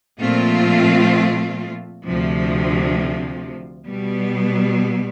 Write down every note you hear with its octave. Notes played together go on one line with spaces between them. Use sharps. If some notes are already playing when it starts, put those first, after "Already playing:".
A#2 F3 A3 C4 F4
D2 C3 F3
B2 G3 B3